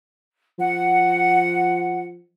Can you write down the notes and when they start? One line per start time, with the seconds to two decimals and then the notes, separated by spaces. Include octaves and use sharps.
0.58 F3 F#5